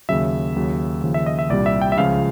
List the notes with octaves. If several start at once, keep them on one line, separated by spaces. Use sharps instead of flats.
D#2 C#3 F#3 E5
D#2 C#3 F#3
D#2 C#3 F3
E5
D#5
E5
C2 A#2 G3 D5
E5
G5
E5
C#2 C#3 F3 F5